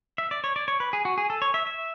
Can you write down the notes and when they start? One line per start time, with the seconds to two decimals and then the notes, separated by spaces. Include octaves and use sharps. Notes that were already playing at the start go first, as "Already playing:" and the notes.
0.18 E5
0.31 D5
0.44 C#5
0.56 D5
0.68 C#5
0.80 B4
0.93 G#4
1.05 F#4
1.18 G#4
1.30 A4
1.42 C#5
1.54 E5
1.67 E5